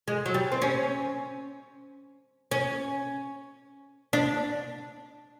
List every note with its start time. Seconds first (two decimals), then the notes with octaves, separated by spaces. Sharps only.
0.08 G#3
0.26 F#3
0.34 G3
0.52 C4
0.62 C#4
2.51 C#4
4.13 D4